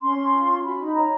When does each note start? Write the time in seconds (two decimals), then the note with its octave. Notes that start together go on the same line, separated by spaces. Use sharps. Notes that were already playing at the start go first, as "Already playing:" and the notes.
0.02 C#4 C6
0.18 C#4
0.34 F4
0.49 C#4
0.65 F#4 B5
0.81 D#4
0.96 C#5 A#5